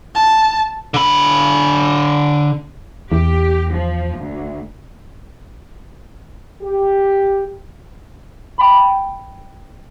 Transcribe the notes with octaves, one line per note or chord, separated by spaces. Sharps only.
A5
D3 B5
E2 G4
F3
D2
G4
G5 B5